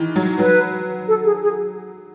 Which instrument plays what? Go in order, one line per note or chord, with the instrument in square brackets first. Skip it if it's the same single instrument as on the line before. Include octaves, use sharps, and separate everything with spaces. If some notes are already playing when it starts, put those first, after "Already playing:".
Already playing: [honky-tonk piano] D#3 E3
F#3
[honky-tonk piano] F#3 [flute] B4
[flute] A4
G#4
G#4